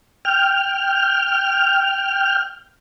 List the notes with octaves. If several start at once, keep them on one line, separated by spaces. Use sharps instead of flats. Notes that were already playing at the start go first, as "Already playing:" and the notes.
G5 F6